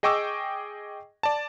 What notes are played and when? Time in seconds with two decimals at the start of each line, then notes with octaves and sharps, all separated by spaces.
0.03 G#4 D#5 G5 C#6 D6 E6
1.23 D5 A5